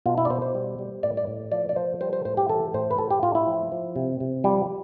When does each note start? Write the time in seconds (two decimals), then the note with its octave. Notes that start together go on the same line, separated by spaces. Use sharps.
0.06 B2 F4
0.18 E4
0.25 D5
0.30 B2 C5
0.42 C5
0.55 G3
0.79 G3
1.03 A2 D5
1.17 D5
1.27 A2
1.52 F3 D5
1.69 D5
1.76 F3 C5
2.01 G3 C5
2.13 C5
2.25 A2 C5
2.37 G4
2.49 E3 A4
2.74 A2 C5
2.91 B4
2.98 A2 A4
3.10 G4
3.22 A2 F4
3.35 E4
3.47 F3
3.72 F3
3.96 C3
4.20 C3
4.44 F3 G3